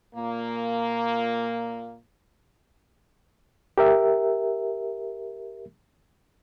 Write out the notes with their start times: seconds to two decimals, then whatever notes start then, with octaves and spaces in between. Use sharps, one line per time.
0.14 A#2 A#3
3.78 G4 A#4 E5